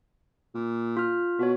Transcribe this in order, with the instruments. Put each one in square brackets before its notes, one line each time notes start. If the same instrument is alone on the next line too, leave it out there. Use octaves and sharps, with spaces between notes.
[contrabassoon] A#2
[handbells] F4 F6
[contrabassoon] B2 [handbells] F#4 C#5